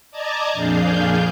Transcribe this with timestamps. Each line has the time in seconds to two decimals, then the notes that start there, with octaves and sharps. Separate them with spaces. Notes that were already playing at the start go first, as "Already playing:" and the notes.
0.11 D5 D#5 A5 A#5 D6 G#6
0.53 F2 A#2 D4 G#4 F5 G6